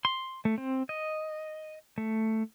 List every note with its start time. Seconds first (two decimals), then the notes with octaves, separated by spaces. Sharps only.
0.05 C6
0.45 A3
0.58 C4
0.89 D#5
1.98 A3